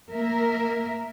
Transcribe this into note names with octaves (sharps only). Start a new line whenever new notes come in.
A#3 A#4 E5